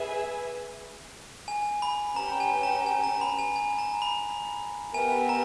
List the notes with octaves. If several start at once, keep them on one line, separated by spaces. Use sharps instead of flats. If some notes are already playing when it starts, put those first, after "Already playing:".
Already playing: G#4 B4 E5 G#5
G#5
B5
C#4 G4 B4 G5 A#5
G#5
A#5
G#5
A#5
B5
G#5
G#5
A#5
B5
B3 G4 A#4 E5 G#5
A#5